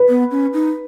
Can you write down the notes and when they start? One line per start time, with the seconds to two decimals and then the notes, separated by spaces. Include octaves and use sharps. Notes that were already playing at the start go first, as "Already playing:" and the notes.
Already playing: B4
0.09 B3
0.31 C#4
0.53 D#4